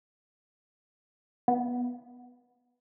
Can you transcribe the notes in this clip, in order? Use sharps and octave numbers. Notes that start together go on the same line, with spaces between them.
B3